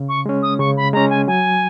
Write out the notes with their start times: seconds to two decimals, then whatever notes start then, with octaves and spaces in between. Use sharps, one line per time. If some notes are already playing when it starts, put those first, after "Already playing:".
Already playing: C#3
0.09 C#6
0.26 G#3 C#4
0.42 D#6
0.59 C#3 C#6
0.77 B5
0.93 G#3 C#4 A#5
1.10 G#5
1.27 F#3 G#5